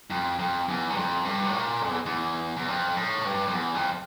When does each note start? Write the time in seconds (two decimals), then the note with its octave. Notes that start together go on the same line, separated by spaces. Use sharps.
0.10 F2
0.39 F2
0.68 E2
0.90 G2
0.97 F2
1.25 G2
1.47 A2
1.54 A#2
1.82 F2
1.90 E2
2.06 E2
2.57 E2
2.68 F2
2.97 A2
3.25 G2
3.48 F2
3.54 E2
3.75 F2